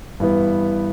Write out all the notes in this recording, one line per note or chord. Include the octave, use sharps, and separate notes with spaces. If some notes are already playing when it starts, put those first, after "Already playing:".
G2 E3 B3